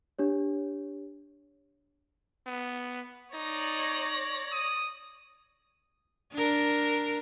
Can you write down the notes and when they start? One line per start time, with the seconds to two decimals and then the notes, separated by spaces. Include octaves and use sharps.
0.19 D4 G4 C#5
2.46 B3
3.34 D#4 C#5 D5 A#6
4.52 D#6
6.33 D4 A#4